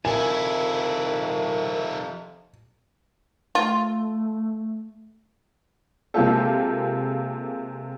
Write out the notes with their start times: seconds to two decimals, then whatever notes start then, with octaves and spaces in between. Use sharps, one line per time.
0.05 F2 C3 D#3 F3 E4 A#4 G#5
3.55 A3 F4
6.14 C3 G#3 A#3 F4 G4 A4